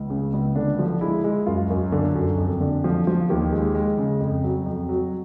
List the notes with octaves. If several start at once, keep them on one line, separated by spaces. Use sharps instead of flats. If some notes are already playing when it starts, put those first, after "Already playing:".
Already playing: C#2
C#3
C#2
D3 D4
F3
G#3 E4
G#3
F#2 F4
F#2
D3
F#2
F2
D3
F3
F3
D#2 G4
G#3
G#3
C#3
F2
F#3
F2
F#3